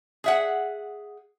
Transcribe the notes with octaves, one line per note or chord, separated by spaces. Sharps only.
G#4 E5 F#5